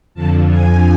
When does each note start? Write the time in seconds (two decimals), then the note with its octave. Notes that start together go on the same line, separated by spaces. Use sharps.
0.14 F2 D3 F3 A5
0.49 G#5